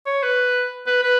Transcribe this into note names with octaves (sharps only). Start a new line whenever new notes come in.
C#5
B4
B4
B4